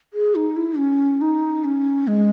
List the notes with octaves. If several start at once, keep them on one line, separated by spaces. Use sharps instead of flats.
G#4
D#4
E4
C#4
D#4
C#4
G#3